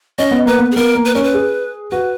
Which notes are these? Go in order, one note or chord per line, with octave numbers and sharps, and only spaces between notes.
C#4 D#5
B3
A#3 B4
B3
G#4
B3 A#4
A#3
B4
C#4 A#4
B4
G#4
F#4 B4